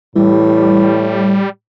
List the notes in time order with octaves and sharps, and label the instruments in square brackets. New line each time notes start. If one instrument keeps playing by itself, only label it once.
[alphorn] A2 [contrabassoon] E3 [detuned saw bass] G3